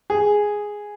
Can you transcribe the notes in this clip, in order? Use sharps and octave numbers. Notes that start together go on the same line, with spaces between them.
G#4